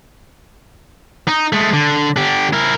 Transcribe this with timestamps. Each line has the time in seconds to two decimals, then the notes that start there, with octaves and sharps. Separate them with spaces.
1.28 D#4
1.52 G#3 A3
1.73 D3
2.17 D3 G4
2.53 E4 A#4